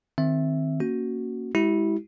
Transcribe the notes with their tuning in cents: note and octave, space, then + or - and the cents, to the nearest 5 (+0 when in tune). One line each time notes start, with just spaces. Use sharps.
D#3 +0 C4 +0 E5 +0
A#3 +0 C#4 +0 F#4 +0
G#3 -15 E4 -15 G4 -40